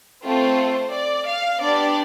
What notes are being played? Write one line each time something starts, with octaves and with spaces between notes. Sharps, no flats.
A3 C4 F4 A4 C5
D5
F5
B3 D4 G4 D5